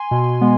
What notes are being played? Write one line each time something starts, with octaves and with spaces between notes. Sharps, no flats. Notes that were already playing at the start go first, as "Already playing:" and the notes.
Already playing: G#5 C6
B2
G#3 B3